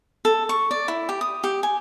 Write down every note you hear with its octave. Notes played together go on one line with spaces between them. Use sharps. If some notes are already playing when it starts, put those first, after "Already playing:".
A4
C#6
D5
E4
G4
D#6
G4
G#5